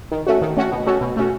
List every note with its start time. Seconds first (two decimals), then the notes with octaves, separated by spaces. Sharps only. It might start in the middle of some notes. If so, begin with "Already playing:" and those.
0.12 D#3
0.27 A3 C#4 F#4
0.42 D#3
0.57 A3 C#4 F#4
0.71 B2
0.86 A3 C#4 F#4
1.01 B2
1.17 A3 C#4 F#4